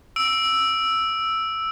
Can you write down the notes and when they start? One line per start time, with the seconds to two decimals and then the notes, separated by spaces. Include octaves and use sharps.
0.16 E6 D7